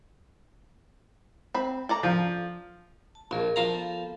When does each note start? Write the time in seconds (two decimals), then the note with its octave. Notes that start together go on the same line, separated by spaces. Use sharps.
1.54 C4 B5
1.89 A4 D5 A#5
2.03 F3
3.15 A5
3.31 A#1 G#4 A#4 D#5
3.56 F3 F5 A#5
3.74 B3 A4